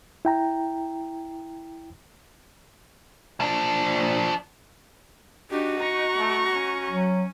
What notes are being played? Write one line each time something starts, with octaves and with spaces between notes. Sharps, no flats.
E4 G5 A#5
F3 D4
D4 D#4 F#4 G4
A#5 C#6
A3
C#4
F#3